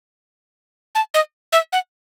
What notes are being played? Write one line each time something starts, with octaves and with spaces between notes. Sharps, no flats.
A5
D#5
E5
F#5